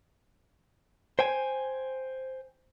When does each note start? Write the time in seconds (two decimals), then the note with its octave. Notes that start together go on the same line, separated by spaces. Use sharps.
1.19 C5 G5 G#5